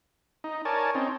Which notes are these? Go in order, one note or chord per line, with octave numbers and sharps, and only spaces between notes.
D#4
A#4 C#5 D5 G#5 A5
C4 C#4 D#4